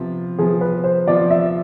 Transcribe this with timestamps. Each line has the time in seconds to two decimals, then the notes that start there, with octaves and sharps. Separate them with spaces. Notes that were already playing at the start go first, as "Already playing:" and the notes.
Already playing: C3 F3 B3 F4
0.38 C3 F3 B3 F4 G#4
0.61 B4
0.84 C5
1.06 C3 F3 B3 F4 D5
1.31 E5